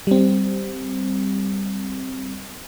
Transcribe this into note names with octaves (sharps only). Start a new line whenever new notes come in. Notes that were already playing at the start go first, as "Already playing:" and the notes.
G3 C4